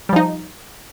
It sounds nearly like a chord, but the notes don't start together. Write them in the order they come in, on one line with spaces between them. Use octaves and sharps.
G3 F3 D#4